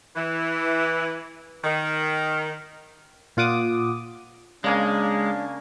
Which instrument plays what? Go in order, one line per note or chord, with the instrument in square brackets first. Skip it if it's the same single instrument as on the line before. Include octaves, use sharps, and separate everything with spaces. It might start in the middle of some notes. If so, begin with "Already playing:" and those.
[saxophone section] E3
D#3
[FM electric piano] A#2 F4 F#5 D6 D#6
[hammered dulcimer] C#3 A#3 G#5 [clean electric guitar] G#3 [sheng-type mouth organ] D4